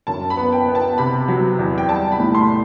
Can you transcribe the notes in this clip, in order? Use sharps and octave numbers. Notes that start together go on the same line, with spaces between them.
F#2 A5
B5
B3
G5
B3
A5
C3 B5
F#3
E2
G5
G3 A5
B5
A2
C6